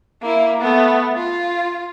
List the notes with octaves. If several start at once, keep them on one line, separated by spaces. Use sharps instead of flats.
A#3 E4
A3 B3
F4